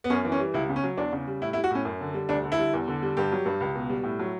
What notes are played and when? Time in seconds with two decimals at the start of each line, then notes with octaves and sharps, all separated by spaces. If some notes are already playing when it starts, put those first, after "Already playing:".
0.04 B3
0.10 F#2 C#4
0.25 E3
0.32 C#4
0.40 G3
0.54 C#2 E4
0.69 C#3
0.76 C#4
0.84 F#3
0.97 E2 D4
1.12 C#3
1.27 G3
1.41 A2 E4
1.53 E4
1.56 G3
1.64 F#4
1.71 A2 C#4
1.85 F#2
2.01 D3
2.14 G3
2.29 D2 D4
2.43 D3
2.52 E4
2.59 G3
2.74 E2
2.88 D3
3.02 G3
3.17 G2 G4
3.32 F#3
3.45 G2
3.60 C#2
3.75 B2
3.90 G3
4.04 A2
4.19 F#3